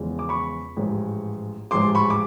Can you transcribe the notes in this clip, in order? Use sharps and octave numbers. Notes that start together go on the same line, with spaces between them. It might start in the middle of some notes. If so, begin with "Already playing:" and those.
Already playing: E2 C#3 F3 G#3 C#4
D6
B5 C#6
A1 G#2 F3 G#3
A1 G#2 F3 G#3 C6 D6
B5 C#6
D6